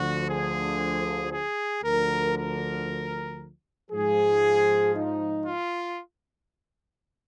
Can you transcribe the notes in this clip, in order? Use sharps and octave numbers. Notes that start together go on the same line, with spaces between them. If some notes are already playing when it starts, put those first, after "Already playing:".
Already playing: D2 D3 F3 F#4
G#4
G#4
D2 D3 F3 A#4
A#4
G#2 F3 G#4
D#4
F4